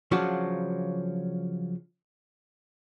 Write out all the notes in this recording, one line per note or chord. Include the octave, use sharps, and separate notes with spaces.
C#3 F3 F#3 D4 F4 F#4